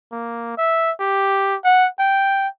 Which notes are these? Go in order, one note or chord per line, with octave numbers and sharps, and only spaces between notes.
A#3
E5
G4
F#5
G5